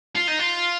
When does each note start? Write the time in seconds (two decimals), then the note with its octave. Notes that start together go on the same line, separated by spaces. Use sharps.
0.16 F4
0.28 D#4
0.40 F4